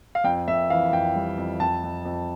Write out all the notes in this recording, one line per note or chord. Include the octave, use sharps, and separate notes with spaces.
F5
F2 G5
F2 E5
E3 F5
F2 G5
G3
F2
F2 A5
F2
F2